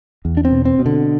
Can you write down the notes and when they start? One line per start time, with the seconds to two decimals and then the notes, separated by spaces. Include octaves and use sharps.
0.25 E2
0.37 D4
0.45 C4
0.51 B2
0.65 C4
0.79 B2
0.86 D3